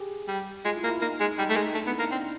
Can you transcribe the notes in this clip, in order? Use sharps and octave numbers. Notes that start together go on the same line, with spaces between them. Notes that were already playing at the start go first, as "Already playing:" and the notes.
Already playing: G4 G#4
G3
G#3 F4
E4
A#3 F4
E4
A#3 D#4
G#3
G3 D#4
A3
G#3 D#4
A3 D4
B3 D#4
E4
A#3
D#4
C4 D4